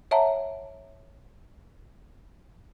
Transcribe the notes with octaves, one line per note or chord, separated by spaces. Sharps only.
C#5 E5 F#5 A5 A#5